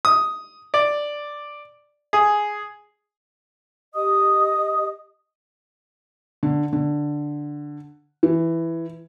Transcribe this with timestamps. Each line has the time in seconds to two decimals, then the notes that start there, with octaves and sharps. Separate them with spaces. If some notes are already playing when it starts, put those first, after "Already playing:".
0.05 D#6
0.74 D5
2.13 G#4
3.95 G4 D#5 D#6
6.43 D3
6.73 D3
8.23 E3